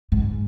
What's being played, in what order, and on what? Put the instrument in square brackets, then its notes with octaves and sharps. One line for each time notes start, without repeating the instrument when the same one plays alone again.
[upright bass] G#2